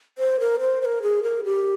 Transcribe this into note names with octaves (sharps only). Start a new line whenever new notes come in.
C5
A#4
C5
C5
A#4
G#4
A#4
G4